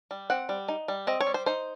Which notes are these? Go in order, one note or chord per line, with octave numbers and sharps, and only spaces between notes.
G3
C4 F#5
G3
D#4
G3
C4 D#5
C#5
G3
C5
D#4 C5